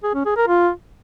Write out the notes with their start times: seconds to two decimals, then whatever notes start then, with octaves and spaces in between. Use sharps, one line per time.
0.03 G#4
0.14 C#4
0.25 G#4
0.36 A#4
0.48 F4